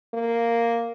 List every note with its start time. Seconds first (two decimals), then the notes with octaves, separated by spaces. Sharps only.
0.14 A#3